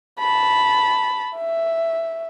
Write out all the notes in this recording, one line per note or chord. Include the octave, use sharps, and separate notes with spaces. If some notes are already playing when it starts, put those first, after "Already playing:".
A5 B5
E5